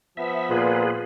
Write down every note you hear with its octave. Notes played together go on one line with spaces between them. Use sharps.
F3 B3 E5
A#2 F4 G#4 B4